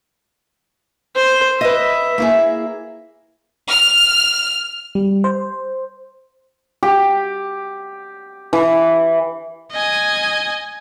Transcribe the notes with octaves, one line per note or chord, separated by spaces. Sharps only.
C5 C6
B4 D#5 E5
A#3 E4 G#4
F6
G3
C5
G4
E3
D#5 G#5